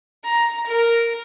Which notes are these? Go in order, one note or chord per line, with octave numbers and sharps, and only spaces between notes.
A#5
A#4